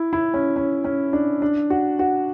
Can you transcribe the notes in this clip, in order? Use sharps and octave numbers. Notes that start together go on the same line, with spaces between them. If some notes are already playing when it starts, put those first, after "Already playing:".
Already playing: E4
E4
C#4
C#4
C#4
D4
D4
F#4
F#4